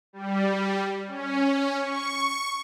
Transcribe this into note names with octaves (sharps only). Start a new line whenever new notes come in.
G3
C#4
C#6